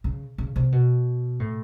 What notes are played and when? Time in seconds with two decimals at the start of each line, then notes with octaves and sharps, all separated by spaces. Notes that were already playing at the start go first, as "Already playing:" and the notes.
0.04 C#3
0.38 C#3
0.56 C3
0.72 B2
1.40 A2